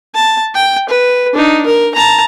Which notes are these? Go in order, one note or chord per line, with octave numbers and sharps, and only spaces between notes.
A5
G5
B4
D4 D#4
A#4
A5 A#5